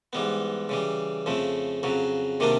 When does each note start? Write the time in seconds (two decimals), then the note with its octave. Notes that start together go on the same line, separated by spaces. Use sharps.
0.13 G#2 E3 G3 B3
0.69 C#3 E3 G3
1.26 F2 C#3 F3 A3
1.83 F2 C#3 F#3
2.40 C3 D#3 G3 A#3 D4